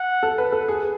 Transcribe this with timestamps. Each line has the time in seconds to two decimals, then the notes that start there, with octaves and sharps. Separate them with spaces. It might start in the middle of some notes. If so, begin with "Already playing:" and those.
Already playing: F#5
0.23 A4
0.38 B4
0.52 A4
0.68 G#4